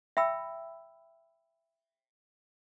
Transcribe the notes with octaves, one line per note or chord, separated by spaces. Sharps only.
E5 G5 B5 E6